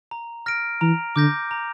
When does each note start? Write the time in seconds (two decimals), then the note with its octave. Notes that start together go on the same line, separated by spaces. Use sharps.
0.11 A#5
0.46 F6 A#6 D7
0.81 E3 A#5
1.16 D3 D6 G6 A#6
1.51 A#5